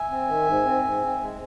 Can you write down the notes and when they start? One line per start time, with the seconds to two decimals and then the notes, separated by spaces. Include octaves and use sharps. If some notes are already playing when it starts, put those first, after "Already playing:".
Already playing: E5 G#5
0.10 C4
0.28 D#3
0.46 G#2
0.65 C4
0.84 G#2
1.02 C4
1.20 G#3